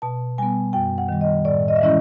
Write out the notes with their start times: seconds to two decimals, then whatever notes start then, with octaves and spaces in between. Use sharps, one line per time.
0.02 B2 A5
0.38 G3 B3 G#5
0.73 F#2 G5
0.98 F#5
1.09 D#3 G3
1.21 D#5
1.45 A2 D5
1.68 D#5
1.76 E5
1.81 E3 G#3 C#4 E4 D#5